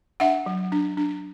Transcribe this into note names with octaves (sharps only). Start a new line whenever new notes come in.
D4 E5 F#5
F#3
D4
D4